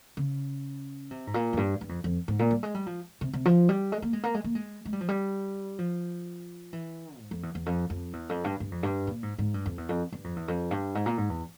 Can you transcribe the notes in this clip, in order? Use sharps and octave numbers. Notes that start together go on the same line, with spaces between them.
C#3
C3
G#2
A#2
F2
G2
G2
F2
F2
G#2
A#2
G3
G#3
G3
F3
C3
C3
F3
G3
G#3
A#3
G#3
A#3
G#3
A#3
G#3
G#3
G3
F3
G3
F3
E3
G#2
F2
E2
E2
F2
F2
E2
F2
G2
G2
F2
G2
A#2
G#2
G#2
G2
F2
E2
F2
G2
F2
E2
F2
G2
G#2
A#2
G#2
E2